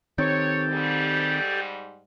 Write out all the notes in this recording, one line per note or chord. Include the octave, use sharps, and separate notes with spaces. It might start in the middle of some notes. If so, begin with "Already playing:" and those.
D#3 C4 G4 A4 C#5
G#2 G3